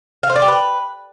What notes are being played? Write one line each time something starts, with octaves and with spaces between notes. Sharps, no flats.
F5
C5
D5
G4
B4